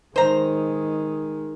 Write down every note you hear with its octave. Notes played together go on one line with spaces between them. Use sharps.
D#3 G#3 C5 A#5